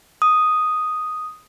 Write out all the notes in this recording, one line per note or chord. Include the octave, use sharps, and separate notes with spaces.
D#6